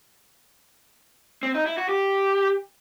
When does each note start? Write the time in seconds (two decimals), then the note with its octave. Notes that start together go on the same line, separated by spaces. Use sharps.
1.43 C4
1.54 D#4
1.66 E4
1.78 F#4
1.89 G4